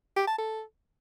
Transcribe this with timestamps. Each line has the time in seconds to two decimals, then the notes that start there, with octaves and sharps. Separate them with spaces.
0.17 G4
0.28 A5
0.38 A4